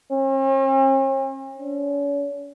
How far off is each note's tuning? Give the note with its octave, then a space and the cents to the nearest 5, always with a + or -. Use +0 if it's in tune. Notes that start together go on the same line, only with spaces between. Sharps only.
C#4 -45
C#4 +40